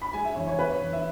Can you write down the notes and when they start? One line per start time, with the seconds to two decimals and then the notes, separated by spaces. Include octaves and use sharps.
0.02 B5
0.13 G#3 G#5
0.25 E5
0.36 E2 C#5
0.47 C#5
0.59 B3 B4
0.70 C#5
0.81 E2
0.93 E5